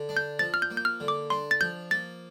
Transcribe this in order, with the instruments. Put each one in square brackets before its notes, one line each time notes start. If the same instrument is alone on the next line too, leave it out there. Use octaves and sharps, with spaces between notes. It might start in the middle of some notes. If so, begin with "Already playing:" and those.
Already playing: [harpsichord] D3
D4
[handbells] G6
[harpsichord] F3 [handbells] A6
[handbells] F6
G6
[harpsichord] A#3
[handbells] G6
F6
[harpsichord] D3
[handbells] D6
[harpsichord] D4 [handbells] C6
[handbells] A6
[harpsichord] F3 [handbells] G6
[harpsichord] A#3 [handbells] A6